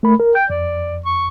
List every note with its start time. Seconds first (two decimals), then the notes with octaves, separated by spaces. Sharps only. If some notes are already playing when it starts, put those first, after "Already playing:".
0.03 A3 A#4 B5
0.19 A#4
0.35 G5 G6
0.50 F2 D5
1.06 C#6